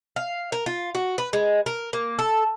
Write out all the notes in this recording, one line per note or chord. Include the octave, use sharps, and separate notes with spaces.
F5
A#4
F4
F#4
B4
G#3
A#4
A#3
A4